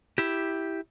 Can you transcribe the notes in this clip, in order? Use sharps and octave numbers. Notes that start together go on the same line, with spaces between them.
E4 G4